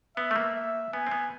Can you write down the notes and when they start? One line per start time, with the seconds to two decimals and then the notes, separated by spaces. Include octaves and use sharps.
0.16 B3 E5
0.31 A3
0.36 A#3
0.55 E5
0.93 B3 G#5
1.07 C4
1.11 B3